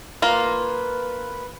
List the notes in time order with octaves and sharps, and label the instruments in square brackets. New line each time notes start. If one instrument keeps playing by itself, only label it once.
[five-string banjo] A#3 F4 [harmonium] B4